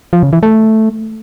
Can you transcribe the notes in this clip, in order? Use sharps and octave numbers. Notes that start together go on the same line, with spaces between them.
F3
C#3
E3
A3